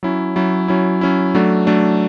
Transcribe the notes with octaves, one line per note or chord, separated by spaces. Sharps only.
F#3 C#4 E4
F#3 C#4 E4
F#3 C#4 E4
F#3 C#4 E4
F#3 A3 D4
F#3 A3 D4